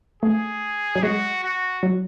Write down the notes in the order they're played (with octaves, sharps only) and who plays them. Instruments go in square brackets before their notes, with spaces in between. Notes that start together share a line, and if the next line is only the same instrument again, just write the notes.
[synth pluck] A3 [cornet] G#4
[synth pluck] F#3
[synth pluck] G#3 [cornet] F#4
[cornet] F#4
[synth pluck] F#3